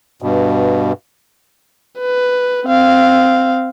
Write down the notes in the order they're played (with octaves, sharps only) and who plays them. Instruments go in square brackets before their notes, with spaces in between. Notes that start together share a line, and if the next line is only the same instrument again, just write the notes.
[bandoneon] G2 B2
[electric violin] B4
C4 F5